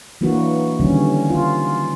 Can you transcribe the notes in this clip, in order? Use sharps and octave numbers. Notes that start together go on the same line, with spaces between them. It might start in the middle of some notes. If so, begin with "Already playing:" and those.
E3 F#3 A#3 D4 F#4 B4
D3 D#3 F#3 G3 C#4
F4